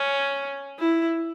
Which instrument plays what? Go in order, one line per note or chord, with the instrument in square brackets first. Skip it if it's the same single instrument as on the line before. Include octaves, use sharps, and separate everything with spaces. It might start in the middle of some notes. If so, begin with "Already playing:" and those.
Already playing: [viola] C#4
E4